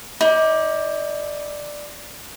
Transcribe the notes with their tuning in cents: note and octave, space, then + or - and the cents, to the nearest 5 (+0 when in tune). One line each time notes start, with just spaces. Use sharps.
D#4 +35 D5 +5